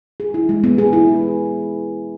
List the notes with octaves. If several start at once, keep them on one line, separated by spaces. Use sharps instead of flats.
G#4
E4
G#3
B3
G#4
E4